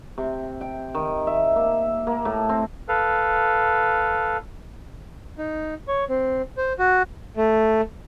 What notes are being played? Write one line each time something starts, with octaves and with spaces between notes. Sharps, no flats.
C3
G5
D#3
E5
A#3
A#3
A2
C4
A4 B4 F5
D#4
C#5
C4
C5
F#4
A3